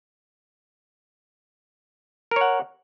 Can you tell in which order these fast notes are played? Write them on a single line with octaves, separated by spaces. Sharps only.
A#4 C#5 F#5